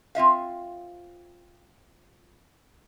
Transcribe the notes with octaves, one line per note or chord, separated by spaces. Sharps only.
C4 F4 E5 F5